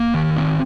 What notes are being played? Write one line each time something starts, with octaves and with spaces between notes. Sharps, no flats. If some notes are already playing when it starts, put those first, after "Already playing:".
Already playing: A#3
D#3
C4